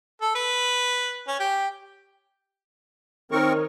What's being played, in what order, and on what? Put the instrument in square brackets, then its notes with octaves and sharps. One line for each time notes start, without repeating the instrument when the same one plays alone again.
[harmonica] A4
B4
C#4
G4
[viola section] D#3 D#4 C#5 [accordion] C4 A#4 C#6